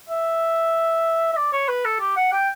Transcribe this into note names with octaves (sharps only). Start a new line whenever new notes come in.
E5
E5
D5
C#5
B4
A4
G4
F#5
G5